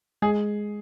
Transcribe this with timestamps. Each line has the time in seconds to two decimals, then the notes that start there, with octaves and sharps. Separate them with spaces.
0.22 G#3 G#4